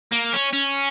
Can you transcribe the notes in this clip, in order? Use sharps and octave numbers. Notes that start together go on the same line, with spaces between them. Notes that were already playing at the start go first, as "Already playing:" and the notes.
A#3
C#4
C#4